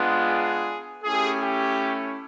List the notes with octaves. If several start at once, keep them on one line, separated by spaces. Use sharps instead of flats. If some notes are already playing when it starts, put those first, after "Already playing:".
Already playing: G#3 B3 D4 F4
G#4
A3 C#4 E4 G4 G#4
G4